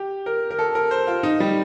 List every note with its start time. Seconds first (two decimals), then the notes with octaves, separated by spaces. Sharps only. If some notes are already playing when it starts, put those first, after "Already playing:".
Already playing: G4
0.26 A#4
0.51 A#4
0.59 A4
0.75 A#4
0.91 C5
1.07 F4
1.23 D#4
1.40 G3